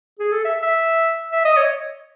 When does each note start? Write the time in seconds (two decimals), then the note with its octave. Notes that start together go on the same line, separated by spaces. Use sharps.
0.19 G#4
0.32 A4
0.45 E5
0.62 E5
1.32 E5
1.45 D#5
1.57 C#5